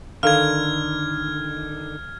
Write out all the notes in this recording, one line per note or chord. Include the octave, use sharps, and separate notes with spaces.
D3 D#3 A4 F5 F6 G#6